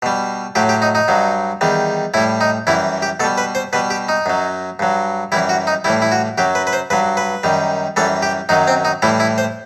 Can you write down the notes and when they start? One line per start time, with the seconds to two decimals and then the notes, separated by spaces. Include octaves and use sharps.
0.02 B2 G3
0.55 A2 F#3 G4
0.69 G4
0.82 D#4
0.95 D#4
1.08 G2 F#3
1.61 E2 D#3 G3
2.14 A2 G3 E4
2.41 D#4
2.67 F#2 E3 G3 E4
3.02 G4
3.20 B2 A4
3.24 G3
3.38 B4
3.55 C5
3.73 B2 G3 B4
3.90 G4
4.08 D#4
4.26 F#2 F#3
4.79 G2 F#3
5.32 F#2 E3 G3 E4
5.49 F#4
5.67 D#4
5.84 A2 E3 G3 E4
6.02 E4
6.12 F#4
6.38 F#2 F#3 G4
6.55 B4
6.67 B4
6.73 C5
6.90 G2 F#3 B4
7.17 B4
7.43 F#2 D#3 G3
7.96 F#2 E3 G3 A4
8.22 G4
8.49 F#2 D#3 F#3 D#4
8.67 C4
8.85 D#4
9.02 A2 E3 G3 E4
9.20 E4
9.38 C5